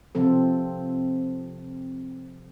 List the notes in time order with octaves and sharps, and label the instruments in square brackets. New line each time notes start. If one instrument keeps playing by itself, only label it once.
[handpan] C3 F3 C4 A4